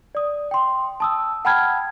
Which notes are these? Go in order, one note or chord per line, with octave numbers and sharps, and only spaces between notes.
D5 D#6
G5 C6
A5 D#6 E6
F#5 G5 A5 B5 F6 G#6